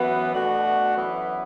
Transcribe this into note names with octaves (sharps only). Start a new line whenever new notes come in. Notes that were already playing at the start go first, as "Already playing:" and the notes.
Already playing: F#2 E3 B3 F#4
B2 A3 D4 F#4
F#2 E3 B3